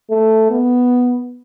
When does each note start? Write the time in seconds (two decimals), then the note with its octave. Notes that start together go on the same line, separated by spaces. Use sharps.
0.10 A3
0.51 B3